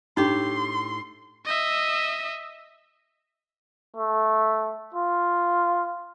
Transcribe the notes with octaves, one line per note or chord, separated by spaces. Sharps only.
A2 D4 D#4 G4 C6
D#5 E5
A3
F4